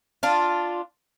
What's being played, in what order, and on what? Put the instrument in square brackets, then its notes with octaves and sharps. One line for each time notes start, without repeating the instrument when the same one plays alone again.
[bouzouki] D4 F4